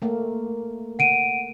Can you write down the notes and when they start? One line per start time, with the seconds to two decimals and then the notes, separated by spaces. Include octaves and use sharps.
0.02 A3 A#3
0.99 F#5 D7 D#7